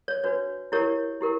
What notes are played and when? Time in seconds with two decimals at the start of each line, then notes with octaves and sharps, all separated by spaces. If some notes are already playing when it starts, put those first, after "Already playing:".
0.08 C#5
0.24 D4 F#4 B4 C#5
0.72 E4 G4 A#4 C#5
1.21 E4 G4 A#4